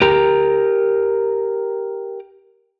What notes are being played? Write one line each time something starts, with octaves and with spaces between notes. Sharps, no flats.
G4 A#4 A#5